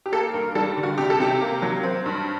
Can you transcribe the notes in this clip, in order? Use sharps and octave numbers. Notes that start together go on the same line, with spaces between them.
G4
A#3 A4
G2 A#4
G3 A4
D3
F#4
C3 G4
A4
C3 G4
A#3
F#3
C4
G2